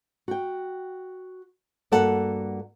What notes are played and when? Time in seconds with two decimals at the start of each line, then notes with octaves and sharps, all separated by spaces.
0.28 F#4 G5
1.92 G2 A#3 F#4 A4 F#5